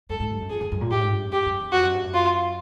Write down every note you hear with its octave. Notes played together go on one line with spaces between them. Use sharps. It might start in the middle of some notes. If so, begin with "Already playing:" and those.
F#2 A4
G#2
G2
F#2
F2 G#4
F2
F#2
A#2
A2 G4
G#2
G2
F#2
G4
F#2
E2
F2 F#4
F#2
G2
F#2
F4